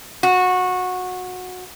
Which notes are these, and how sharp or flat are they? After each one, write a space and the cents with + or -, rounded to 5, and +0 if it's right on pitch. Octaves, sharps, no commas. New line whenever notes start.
F#4 -20